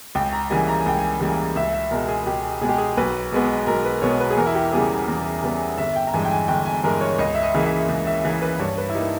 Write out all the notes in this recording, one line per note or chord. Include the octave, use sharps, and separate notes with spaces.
C#2 G5
A#5
C#3 E3 G3 A#3 G#5
A#5
G#5
C#2 G5
G#5
C#3 E3 G3 A#3
C#2 E5
E5
B2 G#3 A#4
G#4
C#2 G4
B2 G#3 G4 G#4
G#4
B1 B4
B2 G#3 B3
B1 A#4
B4
B2 G#3 B3 C#5
B4
G#4
E2 A#4
E4
G4
C#3 G3 B3 G#4
E2
C#3 G3 B3
G1 E5
G5
A#5
G2 E3 G#3 G#5
G5
G#5
G1 G5
G#5
G2 E3 G#3 A#4
C#5
C#2 D#5
E5
D#5
C#3 E3 A#3
E5
C#2
E5
C#3 E3 A#3
B4
G2 C#5
B4
E4
G3 A#3 D#4